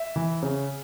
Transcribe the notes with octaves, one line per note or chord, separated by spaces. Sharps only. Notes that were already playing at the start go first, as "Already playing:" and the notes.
Already playing: E5
E3
C#3